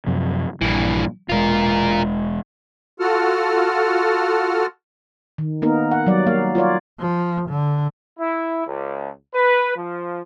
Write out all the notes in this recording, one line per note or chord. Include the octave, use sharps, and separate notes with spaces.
F#2 C3 F3
A#1 G2 E3
E1 G#3 F4 A#4
F4 F#4 A4 F#5 A5 F6
D#3
A#3 B3 D#4 A#4
F#5
F#3 G3 D5
A#3 F5
F4 F#4 C#5 D5
F3
D3
E4
C#2
B4
F3